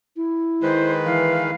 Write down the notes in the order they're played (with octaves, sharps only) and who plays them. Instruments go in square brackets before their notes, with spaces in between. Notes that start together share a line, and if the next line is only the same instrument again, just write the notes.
[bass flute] E4
[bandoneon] D#3 G#3 B4 [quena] C5
[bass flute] E3 [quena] F5